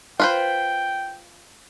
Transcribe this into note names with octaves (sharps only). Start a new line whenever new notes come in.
F4 B4 C5 G5